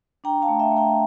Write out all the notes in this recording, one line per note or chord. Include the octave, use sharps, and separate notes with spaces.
D4 G5 A#5
F5 A5
A3
E5 G5
A3
G5 A#5